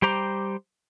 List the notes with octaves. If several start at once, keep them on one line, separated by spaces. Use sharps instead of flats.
G3 G4 C5 A#5 D6